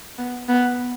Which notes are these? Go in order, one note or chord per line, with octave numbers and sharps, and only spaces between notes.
B3
B3